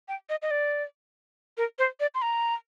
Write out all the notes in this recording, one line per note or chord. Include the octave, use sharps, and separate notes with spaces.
G5
D#5
D#5
D5
A#4
C5
D5
C6
A#5